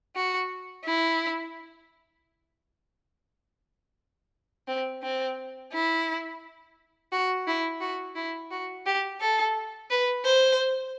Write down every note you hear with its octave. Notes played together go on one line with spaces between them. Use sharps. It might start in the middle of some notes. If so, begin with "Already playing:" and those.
F#4
E4
C4
C4
E4
F#4
E4
F#4
E4
F#4
G4
A4
B4
C5